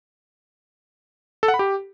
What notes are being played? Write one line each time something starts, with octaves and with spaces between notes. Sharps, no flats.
A4
F#5
B5
G4